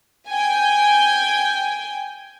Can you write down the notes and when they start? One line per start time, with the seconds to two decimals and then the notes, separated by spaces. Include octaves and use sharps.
0.28 G5 G#5